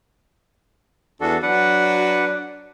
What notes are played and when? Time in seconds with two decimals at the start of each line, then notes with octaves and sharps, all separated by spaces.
1.21 E2 D4 F#4 A4
1.42 F#3 D4 B4 F#5